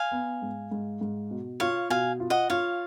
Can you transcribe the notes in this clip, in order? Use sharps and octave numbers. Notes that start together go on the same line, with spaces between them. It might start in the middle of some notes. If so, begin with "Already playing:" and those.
Already playing: F5 G#5
B3
G#2
G#2
G#2
B2
F4 C#5 F5
B2 F5 G#5
F4
D#5 F#5
F4 C#5 F5